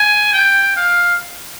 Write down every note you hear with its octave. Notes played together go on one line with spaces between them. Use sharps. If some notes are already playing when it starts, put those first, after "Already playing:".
Already playing: G#5
G5
F5